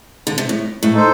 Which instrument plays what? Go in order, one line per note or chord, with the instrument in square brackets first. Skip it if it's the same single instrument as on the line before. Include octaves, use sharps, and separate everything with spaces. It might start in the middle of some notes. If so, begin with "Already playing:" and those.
[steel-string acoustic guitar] D3
C3
A2
A2
[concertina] D#4 A4 C5